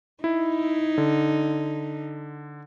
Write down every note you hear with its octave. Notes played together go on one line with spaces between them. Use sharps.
D#4 E4
D3